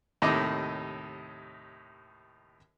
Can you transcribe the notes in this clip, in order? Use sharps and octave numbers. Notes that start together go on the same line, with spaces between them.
D#2 A2 C3 D#4 D#5 D6